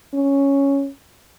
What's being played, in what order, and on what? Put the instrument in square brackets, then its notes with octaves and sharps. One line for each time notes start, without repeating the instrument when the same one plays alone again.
[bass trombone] C#4